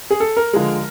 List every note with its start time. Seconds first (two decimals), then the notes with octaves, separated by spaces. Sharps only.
0.11 G#4
0.20 A4
0.37 A#4
0.53 D3 F3 G#3